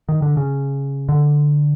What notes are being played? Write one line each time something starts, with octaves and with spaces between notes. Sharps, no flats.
D#3
D3
C#3
D3